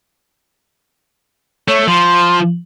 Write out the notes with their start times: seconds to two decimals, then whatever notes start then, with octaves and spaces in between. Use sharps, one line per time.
1.68 A3 C#5
1.88 F3 C6